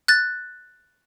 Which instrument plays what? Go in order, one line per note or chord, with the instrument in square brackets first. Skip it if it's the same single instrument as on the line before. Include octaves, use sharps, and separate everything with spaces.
[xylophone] F#6 A6